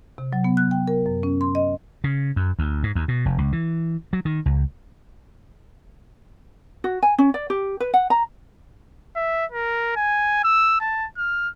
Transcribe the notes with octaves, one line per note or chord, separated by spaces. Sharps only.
C3
F#3
B3
F#6
G5
A#4
F#2
C#4
C6
D#5
C#3
F#2
D2
G#2
D#2
B2
F1
C#2
E3
F#3
D#3
C#2
F#4
G#5
C#4
D5
G4
B4
F#5
A#5
E5
A#4
G#5
E6
A5
F6